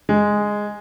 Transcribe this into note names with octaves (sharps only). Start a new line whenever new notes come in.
G#3